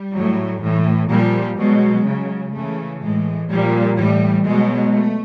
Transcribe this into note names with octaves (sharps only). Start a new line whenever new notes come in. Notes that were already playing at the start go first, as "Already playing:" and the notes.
Already playing: G3
A2 F#3
A2 E3
A#2 F3 G3
B2 F#3 G#3
C#3 F#3
C#3 E3 A3
A2 E3 G#3
A#2 F3 G3
A2 E3 G3
B2 F#3 G#3
A3